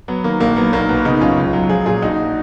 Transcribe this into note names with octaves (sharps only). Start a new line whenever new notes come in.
F#3 B3
D#3 A#3
A#1 A#3
F#3 B3
B1 A#3
B2 B3
C#3 B3 D#4
F#2 C#4 F4
C#2
F#3
F3 F4 G#4
A#2 F4 G#4
A#1 D#4 F#4